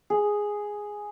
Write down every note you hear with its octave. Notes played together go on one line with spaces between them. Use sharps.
G#4